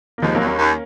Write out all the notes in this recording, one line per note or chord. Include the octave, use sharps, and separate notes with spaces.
A#3
D#2 F3 G#3
F#3 A#3
D#2
A#3 C#4
D#2